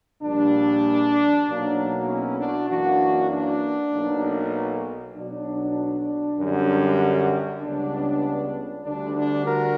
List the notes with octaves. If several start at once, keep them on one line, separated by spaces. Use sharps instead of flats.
A#1 A#2 G3 D4
B1 B2 F#3 A#3
C#4 E4
D4 F#4
F#2 E3 A#3 D4 F#4
D4
B1 B2 A#3
B1 B2 F#3 D4
F#2 D3 G3
C#2 C#3 G3 B3 D4
D2 D3 G3 D4
D4
F#4 A#4